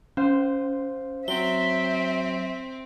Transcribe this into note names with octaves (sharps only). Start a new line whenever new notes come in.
C#4 C5 F5
F#3 C4 E5 G7